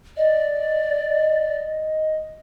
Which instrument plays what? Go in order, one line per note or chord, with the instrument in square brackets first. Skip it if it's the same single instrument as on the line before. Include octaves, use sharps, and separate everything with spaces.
[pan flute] D5 [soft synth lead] D#5